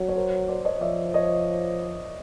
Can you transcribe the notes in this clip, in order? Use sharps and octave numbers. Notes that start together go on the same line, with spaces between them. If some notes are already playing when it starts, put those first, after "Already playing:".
Already playing: F#3
C#5
A#4 C5
C5 D5
C#5 D#5
F3 D5 E5
C#5 D#5